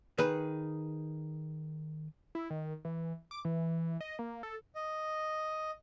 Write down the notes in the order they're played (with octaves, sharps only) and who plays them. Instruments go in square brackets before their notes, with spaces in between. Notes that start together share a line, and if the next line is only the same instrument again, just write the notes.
[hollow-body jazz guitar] D#3 G#4 B4
[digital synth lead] E4
D#3
E3
D6
E3
D#5
A#3
A4
[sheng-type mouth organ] D#5